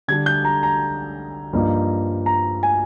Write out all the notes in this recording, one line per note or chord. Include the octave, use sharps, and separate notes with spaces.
D3 G3 D4 G#6
G6
A#5
A#5
G2 F3 A#3 D#4
A#5
G#5